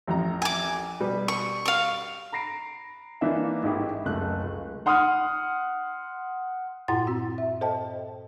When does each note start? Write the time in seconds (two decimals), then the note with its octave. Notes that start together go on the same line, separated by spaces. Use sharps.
0.07 A1 F2 A#5
0.42 G#5 D6
1.00 B2 G3 B4
1.28 C#6
1.65 F5 C#6
2.32 A#5 B5 A#6 C7 D7
3.21 E3 A#3 D4 D#4 B4 E5
3.63 A1 G#2 E4 G4
4.05 F#1 C#2 F#2 C#3 A3 F#6
4.43 C#2
4.86 F#5 C6 D#6 F6
6.88 G2 A#2 E4 F#5 C6 A6
7.07 C4 F#4
7.38 E5
7.61 A4 C5 D#5 G5 A5